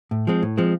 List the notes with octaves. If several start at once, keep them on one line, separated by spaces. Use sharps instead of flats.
A2
F3 G#3 C4
A2
F3 G#3 C4